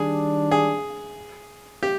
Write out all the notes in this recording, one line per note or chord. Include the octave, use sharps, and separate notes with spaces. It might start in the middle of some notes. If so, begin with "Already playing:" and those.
Already playing: D#3 G3 D4 G#4
G#4
G4